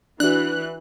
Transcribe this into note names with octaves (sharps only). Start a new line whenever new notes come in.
E3 D4 F#4 F#6